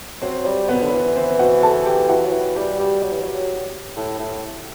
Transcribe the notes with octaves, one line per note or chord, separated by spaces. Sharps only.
F#3 C4 C5
G3
F#3 B3 B4
D3
E3
C4 C5
F#4 F#5
A4 A5
G4 G5
E3 F#4 F#5
F#3
E3
G3 G4
G3
F#3
E3
F#3
A2
A2